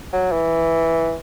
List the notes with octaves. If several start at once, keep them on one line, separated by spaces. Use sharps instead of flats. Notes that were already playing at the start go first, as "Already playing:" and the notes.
F#3
E3